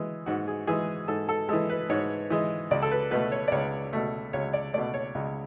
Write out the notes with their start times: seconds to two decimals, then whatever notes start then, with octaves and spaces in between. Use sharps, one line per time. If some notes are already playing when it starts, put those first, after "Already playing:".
Already playing: E3 G#3
0.26 G#2 F#4
0.48 G#4
0.67 E3 G#3 G#4
1.08 G#2 A4
1.29 A4
1.49 E3 G#3 A4
1.70 B4
1.89 G#2 C#5
2.30 E3 G#3
2.71 C#2 D5
2.82 A4
2.91 B4
3.11 B2 A3 B4
3.32 C#5
3.48 D5
3.52 C#2 C#5
3.93 B2 A3
4.33 C#2 C#5
4.53 D5
4.74 B2 A3 D5
4.94 C#5
5.15 C#2